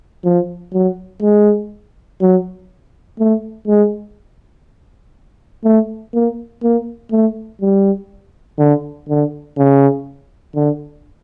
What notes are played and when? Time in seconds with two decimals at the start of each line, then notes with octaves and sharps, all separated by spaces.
0.25 F3
0.74 F#3
1.22 G#3
2.21 F#3
3.19 A3
3.68 G#3
5.64 A3
6.14 A#3
6.63 A#3
7.11 A3
7.62 G3
8.59 D3
9.09 D3
9.58 C#3
10.55 D3